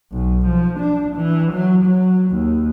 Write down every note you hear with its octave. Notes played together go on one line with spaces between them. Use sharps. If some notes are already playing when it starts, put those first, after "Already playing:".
B1
F3
D4
E3
F#3
F#3
D#2